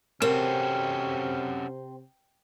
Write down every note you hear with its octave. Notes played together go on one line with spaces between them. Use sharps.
C3 C4 C#4 F#4 A4 A#4